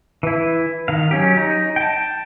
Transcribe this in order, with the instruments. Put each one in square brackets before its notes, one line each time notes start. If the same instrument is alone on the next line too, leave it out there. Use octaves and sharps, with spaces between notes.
[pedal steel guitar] E3 E4
D#3 F5
F#3 C#4 G4
D#4
G5 A5